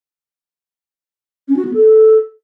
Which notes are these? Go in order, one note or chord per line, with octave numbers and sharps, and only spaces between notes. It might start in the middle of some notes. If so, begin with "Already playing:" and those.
C#4
F#4
B3
A4